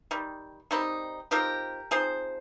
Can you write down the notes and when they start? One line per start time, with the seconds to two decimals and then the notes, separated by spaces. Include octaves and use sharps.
0.11 D#3 G3
0.71 D#3 G3 C4 D#4
1.31 F3 C4 D#4 G4 A#4
1.91 F3 C4 D#4 G#4 C5